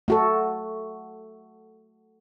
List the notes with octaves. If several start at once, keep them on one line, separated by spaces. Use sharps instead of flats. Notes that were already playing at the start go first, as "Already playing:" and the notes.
A3 F#4 A4